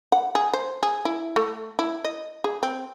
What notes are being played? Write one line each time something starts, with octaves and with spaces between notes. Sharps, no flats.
F#5
G#4
C5
G#4
E4
A3
E4
D#5
G#4
C4